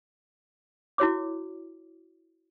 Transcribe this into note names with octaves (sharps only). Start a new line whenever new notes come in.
E4 F#4 C#5 D6